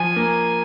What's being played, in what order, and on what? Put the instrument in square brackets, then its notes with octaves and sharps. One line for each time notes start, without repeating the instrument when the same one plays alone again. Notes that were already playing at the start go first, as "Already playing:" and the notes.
Already playing: [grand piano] F3 [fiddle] G#5
[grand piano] A#3